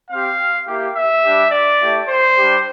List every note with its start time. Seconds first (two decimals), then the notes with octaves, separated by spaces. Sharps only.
0.10 C4 G4 F5
0.67 A#3 E4 G4
0.95 E5
1.23 G3 D4 G4
1.51 D5
1.80 A3 E4 G4
2.09 C5
2.36 G3 D4 G4